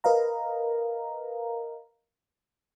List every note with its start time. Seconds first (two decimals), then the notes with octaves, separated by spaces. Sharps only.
0.04 A#4 B4 D#5 F5 A#5